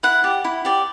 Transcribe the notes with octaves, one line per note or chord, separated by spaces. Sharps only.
E4 F#5
G4 D5
E4
G4 D5